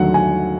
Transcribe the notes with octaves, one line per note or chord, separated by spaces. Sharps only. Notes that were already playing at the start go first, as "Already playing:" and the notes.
Already playing: D#2 D3 F#3 A3 F#5
G#5